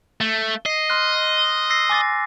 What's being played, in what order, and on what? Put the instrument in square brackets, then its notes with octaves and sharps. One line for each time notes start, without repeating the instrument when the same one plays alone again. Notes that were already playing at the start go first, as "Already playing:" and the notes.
[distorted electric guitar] A3
[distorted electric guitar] D#5 [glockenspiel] C7
[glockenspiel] C6 F6 F#6
E6 A#6 C7
G#5 D6 A6